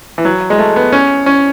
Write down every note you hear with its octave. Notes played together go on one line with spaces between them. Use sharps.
E3
F#3
G#3
A3
B3
C#4
C#4